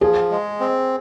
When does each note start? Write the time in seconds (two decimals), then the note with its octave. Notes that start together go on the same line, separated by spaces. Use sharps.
0.01 F3 G#4
0.31 G#3
0.60 C4